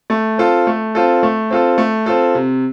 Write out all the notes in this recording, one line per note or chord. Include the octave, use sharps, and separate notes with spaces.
A3
C4 F4 A4
A3
C4 F4 A4
A3
C4 F4 A4
A3
C4 F4 A4
C3